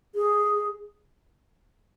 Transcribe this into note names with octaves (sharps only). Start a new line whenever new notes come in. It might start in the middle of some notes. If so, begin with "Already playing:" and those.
G#4